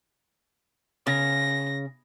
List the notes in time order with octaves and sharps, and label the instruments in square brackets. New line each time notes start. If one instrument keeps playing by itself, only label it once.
[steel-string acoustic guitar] C#3 [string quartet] A#6